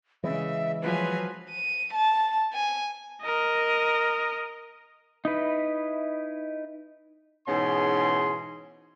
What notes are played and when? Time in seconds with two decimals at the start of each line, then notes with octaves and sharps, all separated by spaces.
0.24 C#3 E3 G#3 E5
0.82 F3 F#3 B4 G#5
1.50 D#7
1.94 A5
2.53 G#5
3.22 A#4 D#5
5.25 D#4 E4 B4
7.47 G#2 B2 E3 C#4 G#4 C6